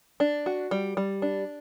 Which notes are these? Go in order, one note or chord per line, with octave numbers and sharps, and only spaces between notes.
D4
F#4
G3
G3
D4